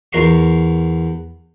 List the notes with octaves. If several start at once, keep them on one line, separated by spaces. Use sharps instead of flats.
E2 A#4 C6 C#6